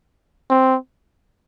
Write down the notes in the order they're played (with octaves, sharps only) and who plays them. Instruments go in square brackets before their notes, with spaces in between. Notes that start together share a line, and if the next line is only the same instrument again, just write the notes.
[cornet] C4